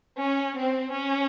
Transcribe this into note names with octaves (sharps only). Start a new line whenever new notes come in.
C#4
C4
C#4